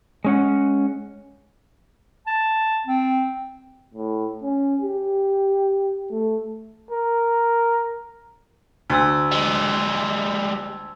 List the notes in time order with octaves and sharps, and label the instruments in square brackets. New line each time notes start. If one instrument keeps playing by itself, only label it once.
[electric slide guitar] G#3 C#4 F#5
[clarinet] A5
C4
[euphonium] A2
C#4
G4
A3
[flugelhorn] A#4
[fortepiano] D2 [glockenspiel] A5 C6 E6
[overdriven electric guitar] G3 G#3